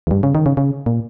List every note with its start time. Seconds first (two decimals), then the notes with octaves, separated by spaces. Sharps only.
0.07 E2
0.11 G2
0.23 C#3
0.35 D#3
0.46 C#3
0.57 C#3
0.86 A#2